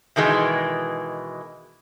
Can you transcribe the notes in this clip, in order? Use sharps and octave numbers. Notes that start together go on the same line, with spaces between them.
B2 D#3 E3 G#3